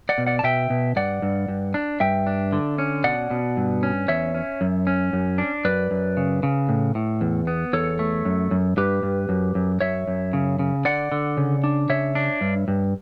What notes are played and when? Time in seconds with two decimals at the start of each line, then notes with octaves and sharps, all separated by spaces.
0.09 D5 F#5
0.18 B2
0.26 D5 F#5
0.39 A5
0.43 B2 E5 G5
0.70 B2
0.96 G2 D5 F#5
1.22 G2
1.48 G2
1.74 D4
2.00 G2 E5 G5
2.27 D4
2.53 D3
2.78 C#4
3.04 B2 D5 F#5
3.31 B2
3.57 G2
3.83 C#4
4.08 E2 C#5 E5
4.34 C#4
4.61 F#2
4.87 C#4
5.13 F#2
5.38 D4
5.65 F#2 B4 D5
5.91 F#2
6.17 C#3
6.43 C#3
6.69 A2
6.95 A2
7.21 E2
7.47 B3
7.73 E2 A4 C#5
7.99 A3
8.25 F#2
8.51 F#2
8.77 G2 G4 B4
9.03 G2
9.29 F#2
9.55 F#2
9.81 F#2 C#5 E5
10.08 F#2
10.33 C#3
10.59 C#3
10.85 D3 D5 F#5
11.12 D3
11.37 C#3
11.64 D4
11.89 C#3 C#5 E5
12.15 D4
12.41 G2
12.68 G2